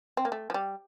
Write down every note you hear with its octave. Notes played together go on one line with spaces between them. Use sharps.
C4
A#3
A3
F3
G3